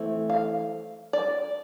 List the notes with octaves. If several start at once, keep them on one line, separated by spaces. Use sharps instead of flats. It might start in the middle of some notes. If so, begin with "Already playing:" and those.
Already playing: E3 A3 C4
F5
D5